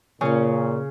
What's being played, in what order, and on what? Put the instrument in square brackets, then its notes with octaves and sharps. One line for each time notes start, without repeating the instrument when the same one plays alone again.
[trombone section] A#2 [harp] C#3 C#4